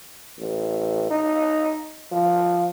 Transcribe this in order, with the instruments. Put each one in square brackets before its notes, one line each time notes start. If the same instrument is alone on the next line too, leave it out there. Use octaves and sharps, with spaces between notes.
[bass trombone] A1
D#4
F3